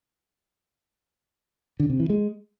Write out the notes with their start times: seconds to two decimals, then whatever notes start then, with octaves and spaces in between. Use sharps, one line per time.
1.80 D3
1.90 C3
2.00 E3
2.10 G#3